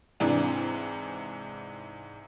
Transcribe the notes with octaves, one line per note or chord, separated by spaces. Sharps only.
G#2 C3 E3 D4